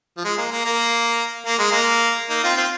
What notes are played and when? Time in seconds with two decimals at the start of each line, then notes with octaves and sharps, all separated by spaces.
0.17 F3
0.25 G#3
0.38 A#3
0.51 A#3
0.65 A#3
1.47 A#3
1.59 G#3
1.71 A#3
2.29 A#3 D#4
2.43 C4 F4
2.57 C4 F4